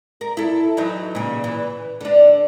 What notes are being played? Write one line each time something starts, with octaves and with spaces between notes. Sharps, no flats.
A#4
E4 A4
E3 F#3 D#4
A#2 C#3
E3
D3 D4